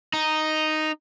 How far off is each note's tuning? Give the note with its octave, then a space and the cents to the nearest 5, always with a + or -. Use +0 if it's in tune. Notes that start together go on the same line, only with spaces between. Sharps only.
D#4 -5